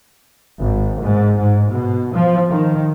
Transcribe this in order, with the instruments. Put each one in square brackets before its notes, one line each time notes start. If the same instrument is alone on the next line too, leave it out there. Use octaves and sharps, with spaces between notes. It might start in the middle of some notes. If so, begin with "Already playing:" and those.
[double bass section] G#1
G#2
G#2
B2
F3
D#3